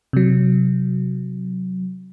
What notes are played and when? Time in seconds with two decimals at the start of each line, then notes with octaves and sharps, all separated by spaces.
0.13 C3 F#3